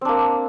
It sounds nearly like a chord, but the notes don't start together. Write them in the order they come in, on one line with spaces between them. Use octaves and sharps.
C4 D4 A#3